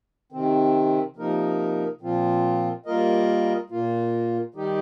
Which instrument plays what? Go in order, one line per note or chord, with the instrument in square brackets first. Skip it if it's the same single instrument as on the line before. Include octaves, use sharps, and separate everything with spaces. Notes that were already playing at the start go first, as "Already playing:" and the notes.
[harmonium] C3 D#3 C4
C3 F3 A#3 D#4 A#4
A#2 F3 C4 F4
G3 A#3 F4 A#4 D#5
A#2 A#3 F4
D#3 G3 D#4 G4